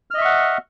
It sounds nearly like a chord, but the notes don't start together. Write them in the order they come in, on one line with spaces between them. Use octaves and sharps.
F6 D#5 E5 C#6 F#5